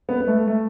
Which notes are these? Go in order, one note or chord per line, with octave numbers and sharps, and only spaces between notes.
B3
B3
A3
A3